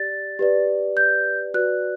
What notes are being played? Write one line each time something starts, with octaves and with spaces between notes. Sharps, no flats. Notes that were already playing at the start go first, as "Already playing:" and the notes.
Already playing: G4 D5 A6
G4 B4 D5
G6
F#4 B4 D5 F#6